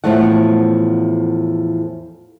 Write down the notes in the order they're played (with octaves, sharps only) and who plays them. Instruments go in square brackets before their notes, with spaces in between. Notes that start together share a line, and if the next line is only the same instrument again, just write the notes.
[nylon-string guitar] E2 A2 D#3 F3 A3 F#5